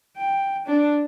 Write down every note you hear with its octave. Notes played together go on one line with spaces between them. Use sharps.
G5
D4